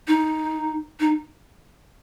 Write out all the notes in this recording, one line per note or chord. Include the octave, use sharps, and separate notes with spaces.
D#4
D#4